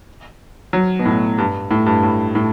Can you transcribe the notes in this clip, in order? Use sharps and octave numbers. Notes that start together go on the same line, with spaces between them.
F#3
B2
A2
G2
A2
G2
A2
A2